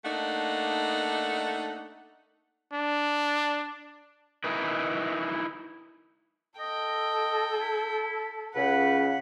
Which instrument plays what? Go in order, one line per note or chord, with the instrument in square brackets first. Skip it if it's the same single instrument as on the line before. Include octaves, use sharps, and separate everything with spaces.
[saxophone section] A3 A#3 D4 D#4 F#5
[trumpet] D4
[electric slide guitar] D#4 E4 A#4 B4
[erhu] A4 [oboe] D#5 [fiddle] G5
[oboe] E4
[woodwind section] C#2 C#3 [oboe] B4 [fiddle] F#5